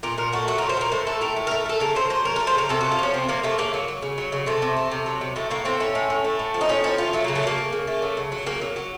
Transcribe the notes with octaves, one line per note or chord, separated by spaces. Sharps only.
A#2 A#4
A#2 A#4
A3 F#4
F#3 F#4
A#4
A#2
C5
A#2 A#4
A2 C5
A3 A4
A2 A#4
A3
A#4
A3
A3 A4
C#3 A#4
F#3 C5
F#3 C5
A3 A#4
A#4
A3
C5
C#3 A#4
C3 A4
F#4
A3
F4
F3 C#4
C3 C4
C3 A#3
C3 A3
C#3 A#3
F#3
F#3
C#3
F#3
C#3
C3 A3
C3
A3
C3
F#3
C3
A2 A3
A2 A#3
A2 C4
A3 C#4
A2
A2
A3
A2
F3
D#4
A2 C#4
F3 C#4
A3 F4
F#3 A3
A#3
C#3
A3
C#3 A#3
C#3
C#3
A3
F#3
C#3
F#3
C#3 A#3
F#3
F#3